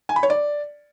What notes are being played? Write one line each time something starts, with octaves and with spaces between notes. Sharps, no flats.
G#5
B5
C#5
D5